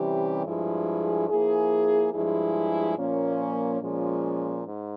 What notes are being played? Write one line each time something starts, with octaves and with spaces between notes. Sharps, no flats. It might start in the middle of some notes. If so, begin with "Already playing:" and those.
Already playing: C3 E3 G3 C#4 G4
G2 F3 G#3 E4 G#4
F3 A#3 E4 G#4
G2 F3 G#3 E4 G#4
A#2 F3 A#3 C#4
A#2 F3 G#3 C#4
G#2